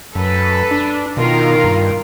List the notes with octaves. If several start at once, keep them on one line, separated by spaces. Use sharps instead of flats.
F#2 A4 B4
D4
B2 D#3 F4 A#4
G2